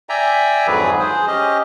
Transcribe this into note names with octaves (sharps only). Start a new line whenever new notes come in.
D5 E5 G5 G#5 A#5
F2 G#2 D3 F#3 G#4 B4
G#4 C5
C#4 G4 D#5